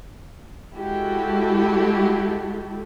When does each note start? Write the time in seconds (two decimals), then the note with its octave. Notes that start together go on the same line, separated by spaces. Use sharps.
0.75 G#3 E4 F#4 G4 A4